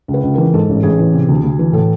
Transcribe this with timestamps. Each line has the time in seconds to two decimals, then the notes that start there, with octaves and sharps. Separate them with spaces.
0.08 C#2
0.14 B4
0.23 C#2
0.34 E3 A#4
0.54 G#2 A4
0.69 A1
0.83 A1 G#4
0.99 E3
1.13 C3
1.28 D2
1.43 D2
1.59 E3
1.73 A2 A4